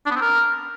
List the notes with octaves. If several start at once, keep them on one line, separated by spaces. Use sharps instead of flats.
D4
B3
C4
A#4